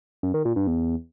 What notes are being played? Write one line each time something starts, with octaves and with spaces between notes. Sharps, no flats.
F#2
D#3
A#2
G2
E2